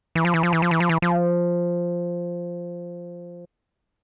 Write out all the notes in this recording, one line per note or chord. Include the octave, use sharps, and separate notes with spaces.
E3
F3
E3
F3
E3
F3
E3
F3
E3
F3